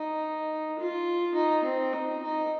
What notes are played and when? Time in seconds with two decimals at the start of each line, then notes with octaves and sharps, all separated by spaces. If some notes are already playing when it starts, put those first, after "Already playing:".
Already playing: D#4
0.79 F4
1.35 D#4
1.64 C4
1.93 D#4
2.22 D#4